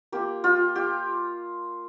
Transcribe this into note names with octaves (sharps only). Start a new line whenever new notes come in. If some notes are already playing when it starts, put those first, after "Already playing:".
A#3 F4 G4
F4
G4